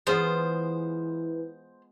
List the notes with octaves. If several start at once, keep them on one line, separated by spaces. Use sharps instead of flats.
E3 G#3 B3 F4 C5